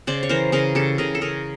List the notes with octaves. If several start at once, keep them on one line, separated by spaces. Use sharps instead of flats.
C#3 C5 D5
C#5
E3 A#4 C5
C#3 G#4 A#4
C#3 G4 A4
C#3 G#4 A#4
A4
C#3 G#4 A#4